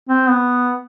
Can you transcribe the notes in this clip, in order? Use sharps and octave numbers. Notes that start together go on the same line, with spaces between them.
C4
B3